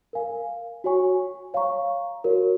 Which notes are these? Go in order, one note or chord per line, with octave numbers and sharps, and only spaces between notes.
A#4 F5 G#5
F#4 C#5 G#5 C#6
C#5 F5 A#5 C#6
F#4 A#4 C#5